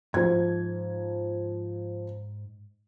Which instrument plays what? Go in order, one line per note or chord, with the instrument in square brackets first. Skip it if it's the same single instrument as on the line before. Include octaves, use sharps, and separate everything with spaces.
[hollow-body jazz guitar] G#2 [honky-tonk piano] F3 G#6